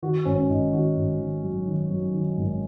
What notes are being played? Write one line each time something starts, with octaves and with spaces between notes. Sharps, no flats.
D#3 F#4
G#1 C#4
G#1 D#4
D#3 F#4
G#1
D#3
F#2
D#3
F#2
D#3
G#1